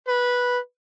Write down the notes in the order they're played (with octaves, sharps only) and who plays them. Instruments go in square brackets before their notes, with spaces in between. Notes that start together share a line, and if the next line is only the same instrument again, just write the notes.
[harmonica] B4